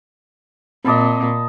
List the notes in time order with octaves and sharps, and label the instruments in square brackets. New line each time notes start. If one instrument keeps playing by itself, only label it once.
[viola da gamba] A#2 [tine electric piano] C4 D6 [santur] D#5 A5 B5